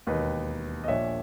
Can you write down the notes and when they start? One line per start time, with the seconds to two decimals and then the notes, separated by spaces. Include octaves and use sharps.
0.07 E1 D#2 D#3 B4 D#5
0.84 D#5
0.88 A#1 A#2 C#5 E5